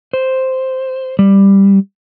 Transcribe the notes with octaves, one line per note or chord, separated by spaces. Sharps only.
C5
G3